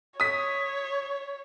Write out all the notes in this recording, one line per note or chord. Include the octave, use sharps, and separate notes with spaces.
C#5 D#6 B6